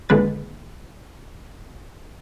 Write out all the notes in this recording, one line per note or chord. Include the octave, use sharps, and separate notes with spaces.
G#1 A#2 D3 G#3 B4 A6